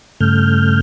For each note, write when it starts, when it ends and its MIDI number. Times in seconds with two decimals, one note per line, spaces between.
0.20 0.81 43
0.20 0.81 49
0.20 0.81 57
0.20 0.81 89
0.20 0.81 91